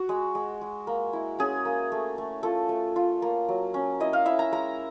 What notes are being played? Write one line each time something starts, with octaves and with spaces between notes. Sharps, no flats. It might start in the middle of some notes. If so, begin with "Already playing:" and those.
Already playing: F#4
G#3
G#3
G#3
A#3
E4
C#4 G#4
A#3
A3
A3
F4 A4
A3
F4
A#3
F#3
C#4
E4 D#5
F5
E4 E5
A#5
G#3 A#5